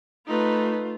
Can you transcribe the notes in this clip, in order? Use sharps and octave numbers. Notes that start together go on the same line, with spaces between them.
A3 D#4 F4 B4